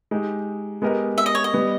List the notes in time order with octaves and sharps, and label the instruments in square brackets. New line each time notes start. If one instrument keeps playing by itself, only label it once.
[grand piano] G#3 D#4 G4
G#3 B3 G4 A#4 D#5
[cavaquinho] E5
D#5
C#5
D#5
[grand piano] G3 B3